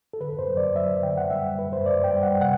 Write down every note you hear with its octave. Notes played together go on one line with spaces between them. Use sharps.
A4
D3 B4
C5
F#3
D5
F#3 E5
D3 G5
F#5
G3 E5
G2 B4
C5
G2 D5
G5
G3
F#5
C3 F#5